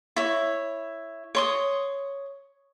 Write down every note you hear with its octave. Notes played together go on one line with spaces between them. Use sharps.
E4 C#5
C#5 C6 D#6